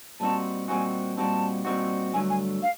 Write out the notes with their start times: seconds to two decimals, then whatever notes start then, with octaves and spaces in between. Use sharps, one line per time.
0.20 A#2 G3 C4 D#4 F#4 A5
0.68 A#2 G3 C4 D#4 F#4 G#5
1.17 A#2 G3 C4 D#4 F#4 A5
1.65 A#2 G3 C4 D#4 F#4
2.14 G2 D3 F#3 A3 G#5
2.30 G#5
2.63 F5